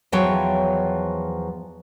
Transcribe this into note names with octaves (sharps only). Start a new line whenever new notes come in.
E2 F3 F#3 C#5 G5